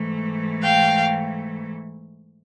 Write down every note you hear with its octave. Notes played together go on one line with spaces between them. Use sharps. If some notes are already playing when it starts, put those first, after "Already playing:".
Already playing: G#2 E3 A3
F5 G5